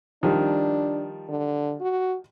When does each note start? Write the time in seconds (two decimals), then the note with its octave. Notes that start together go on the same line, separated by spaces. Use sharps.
0.23 D#3 F3 G3 D4
1.29 D3
1.81 F#4